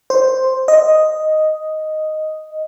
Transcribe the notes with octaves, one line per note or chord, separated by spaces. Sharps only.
C5
D#5